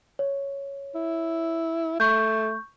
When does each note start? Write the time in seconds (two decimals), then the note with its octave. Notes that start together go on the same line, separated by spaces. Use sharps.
0.19 C#5
0.95 E4
2.00 A3 C#6 G6